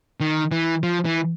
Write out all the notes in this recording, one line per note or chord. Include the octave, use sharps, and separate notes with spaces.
D#3
E3
F3
E3